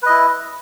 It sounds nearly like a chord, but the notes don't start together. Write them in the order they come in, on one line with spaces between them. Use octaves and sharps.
B4 D#5 E4